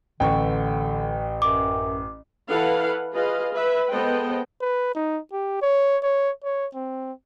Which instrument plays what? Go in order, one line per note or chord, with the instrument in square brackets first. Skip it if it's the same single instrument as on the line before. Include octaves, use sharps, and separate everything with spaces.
[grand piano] A1 C#6 [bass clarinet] D3 [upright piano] B4 G5
[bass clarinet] F#2 [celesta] D6
[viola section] E3 E4 A4 B4 F5 F#5
F4 G#4 B4 D#5 F5
B4 E5
G#3 B3 A4 C5 D#5 G5
[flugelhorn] B4
D#4
G4
C#5
C#5
C#5
C4